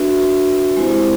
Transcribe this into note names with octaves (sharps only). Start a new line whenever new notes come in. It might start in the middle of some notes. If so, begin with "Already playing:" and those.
Already playing: D4 F#4 B4 E5
G#3 C4 E4 G4 C5